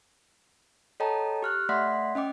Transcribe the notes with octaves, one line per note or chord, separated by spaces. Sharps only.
A4 C#5 D#5 G5 A5 A#5
G4 F6 F#6
A3 D5 E5 F#5 C6 B6
C#4 D#5 G5 D6